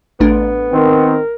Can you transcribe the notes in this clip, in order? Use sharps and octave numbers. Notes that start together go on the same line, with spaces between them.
A1 A3 B3 D4
D#3 C4 A#4